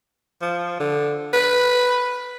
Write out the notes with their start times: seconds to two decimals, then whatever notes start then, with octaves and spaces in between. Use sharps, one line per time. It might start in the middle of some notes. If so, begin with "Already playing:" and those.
0.42 F3
0.80 D3
1.33 B4